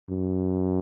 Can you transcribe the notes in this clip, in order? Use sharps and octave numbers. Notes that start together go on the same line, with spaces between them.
F#2